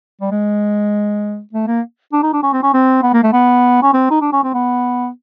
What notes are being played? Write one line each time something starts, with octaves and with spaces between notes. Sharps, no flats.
G3
G#3
A3
A#3
D4
D#4
D4
C#4
C4
C#4
C4
B3
A#3
A3
B3
C#4
C4
D#4
D4
C#4
C4
B3